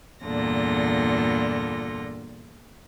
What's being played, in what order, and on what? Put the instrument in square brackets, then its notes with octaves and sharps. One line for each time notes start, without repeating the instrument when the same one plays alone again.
[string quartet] E2 G2 A#2 D3 F4 A#6